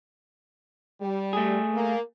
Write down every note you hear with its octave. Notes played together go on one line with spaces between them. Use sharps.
G3
A3 G#4
A#3